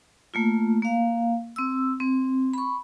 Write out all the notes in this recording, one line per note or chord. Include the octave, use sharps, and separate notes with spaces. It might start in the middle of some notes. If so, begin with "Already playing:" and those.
A3 A#3 F4
A#3 F5
C4 E6
C4
B5 C#6